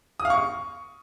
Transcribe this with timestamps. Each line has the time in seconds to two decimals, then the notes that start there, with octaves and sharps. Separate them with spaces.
0.20 D#6
0.25 F5
0.30 C#6